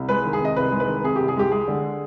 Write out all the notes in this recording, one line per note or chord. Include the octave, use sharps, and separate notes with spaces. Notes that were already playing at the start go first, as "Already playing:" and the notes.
Already playing: C2
G#3 B4
D#3
G#4
C3 D#5
C2 B4
G#3
B4
D#3
C3 G#4
C2 G4
G#4
G#3 G4
G#3 G#4
D3